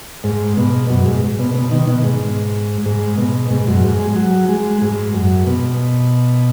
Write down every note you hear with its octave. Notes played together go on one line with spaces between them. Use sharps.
G#2
B2
F#2
G#2
B2
B2
D#3
B2
G#2
G#2
B2
G#2
F#2
G#2
G#3
F#3
G#3
G#2
F#2
B2